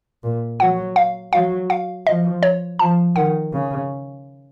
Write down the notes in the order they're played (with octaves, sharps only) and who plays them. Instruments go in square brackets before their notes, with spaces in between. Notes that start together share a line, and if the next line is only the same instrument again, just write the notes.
[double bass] A#2
[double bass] F#3 [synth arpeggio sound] F#5
[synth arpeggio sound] F5
[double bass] F#3 [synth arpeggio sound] F5
[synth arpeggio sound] F5
[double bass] F3 [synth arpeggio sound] D#5
[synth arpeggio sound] C#5
[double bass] F3 [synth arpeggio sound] A5
[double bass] D#3 [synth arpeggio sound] F#5
[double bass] C#3